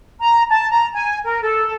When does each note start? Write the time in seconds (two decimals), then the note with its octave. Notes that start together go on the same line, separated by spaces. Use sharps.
0.20 A#5
0.50 A5
0.70 A#5
0.94 G#5
1.24 A#4
1.41 A4